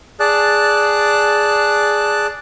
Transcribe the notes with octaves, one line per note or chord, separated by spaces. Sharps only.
G#4 D5 A5 F#6